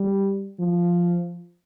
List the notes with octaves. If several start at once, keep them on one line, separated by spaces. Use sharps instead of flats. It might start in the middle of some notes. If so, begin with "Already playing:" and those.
Already playing: G3
F3